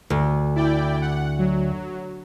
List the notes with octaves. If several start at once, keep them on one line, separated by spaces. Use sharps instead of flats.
D2
E4 D5 G5
F#5
F#3